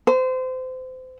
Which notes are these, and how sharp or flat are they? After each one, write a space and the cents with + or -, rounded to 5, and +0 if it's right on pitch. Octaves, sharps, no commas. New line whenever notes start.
C5 -30